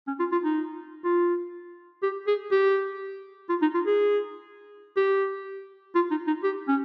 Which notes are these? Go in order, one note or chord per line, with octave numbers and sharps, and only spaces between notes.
C#4
F4
F4
D#4
F4
G4
G#4
G4
F4
D#4
F4
G#4
G4
F4
D#4
D#4
G4
C#4